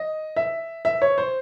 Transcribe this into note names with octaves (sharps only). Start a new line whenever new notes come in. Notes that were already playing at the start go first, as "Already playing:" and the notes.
Already playing: D#5
E5
E5
C#5
C5